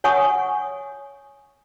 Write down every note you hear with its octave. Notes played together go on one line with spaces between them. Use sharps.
C#5 F#5 G#5 C#6 D#6